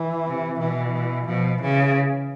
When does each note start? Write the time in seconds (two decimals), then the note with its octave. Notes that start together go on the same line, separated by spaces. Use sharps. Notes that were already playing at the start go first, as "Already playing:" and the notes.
Already playing: E3
0.26 C3
0.59 B2 E3
0.93 E3
1.26 B2 F3
1.60 C#3 E3